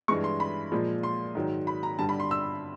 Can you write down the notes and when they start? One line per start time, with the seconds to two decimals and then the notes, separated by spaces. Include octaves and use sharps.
0.08 G2 E3 G#3 C#6
0.24 C6
0.40 B5
0.72 A#2 F3 G#3
1.03 C6
1.35 G#2 D#3 F#3
1.67 B5
1.83 A#5
1.99 G2 D3 G3 A5
2.09 B5
2.20 C6
2.31 E6